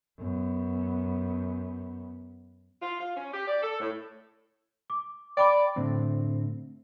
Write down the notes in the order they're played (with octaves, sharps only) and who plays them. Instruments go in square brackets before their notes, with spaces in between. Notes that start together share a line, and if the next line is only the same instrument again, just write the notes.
[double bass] F#2 B3
[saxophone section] F4
F4
C#4
G4
D5
A4
A2
[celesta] D6
[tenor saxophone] D5 [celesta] G5 B5 D6
[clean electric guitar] A2 D3 C4